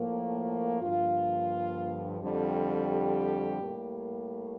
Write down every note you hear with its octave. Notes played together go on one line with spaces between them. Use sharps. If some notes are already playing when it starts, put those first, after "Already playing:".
Already playing: A2 F3 A#3
G2 D3 F3 A#3 F4
F2 D3 G3
G4
A2 G3 A#3